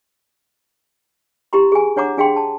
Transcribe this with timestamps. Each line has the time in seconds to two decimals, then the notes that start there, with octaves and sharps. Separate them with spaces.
1.53 E4 G4 A#5 C6
1.72 G#4 G#5
1.96 D4 C#5 F#5 A#5 D6
2.17 D4 G#4 F5 G5 C6
2.36 A5